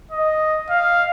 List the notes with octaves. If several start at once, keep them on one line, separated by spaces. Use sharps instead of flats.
D#5
F5